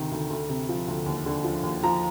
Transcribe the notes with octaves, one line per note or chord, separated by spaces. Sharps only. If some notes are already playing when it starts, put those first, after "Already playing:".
Already playing: D2 C3 D#3
D2
D2
C3
F3
D2
D#2
D3
F3
D#2
F3 A#5